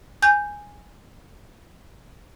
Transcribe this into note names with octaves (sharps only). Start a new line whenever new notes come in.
G#5 G6